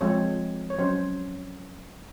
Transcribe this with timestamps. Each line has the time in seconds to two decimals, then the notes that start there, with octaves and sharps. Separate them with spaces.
0.01 F3 G#3 C4 C#5
0.70 C#5
0.78 F#3 C#4 C5